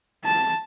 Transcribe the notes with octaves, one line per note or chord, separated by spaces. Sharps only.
A5